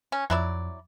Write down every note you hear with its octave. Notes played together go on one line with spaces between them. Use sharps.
C#4
F2 F#3 E4 D5